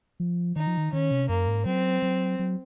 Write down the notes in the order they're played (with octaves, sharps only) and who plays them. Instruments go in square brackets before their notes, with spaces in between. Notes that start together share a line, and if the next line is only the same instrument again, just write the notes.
[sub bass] F3
[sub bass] D#3 [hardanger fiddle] D#4
[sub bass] F3
D#3
[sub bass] D#3 [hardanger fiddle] C#4
[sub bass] C3
[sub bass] F#2 [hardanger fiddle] A#3
[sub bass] G#2
[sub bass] F#3 [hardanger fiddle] C4
[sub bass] F#3
F#3